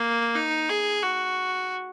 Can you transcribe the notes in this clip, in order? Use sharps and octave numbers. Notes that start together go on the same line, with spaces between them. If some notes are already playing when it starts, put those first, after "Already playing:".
Already playing: A#3
D#4
G#4
F#4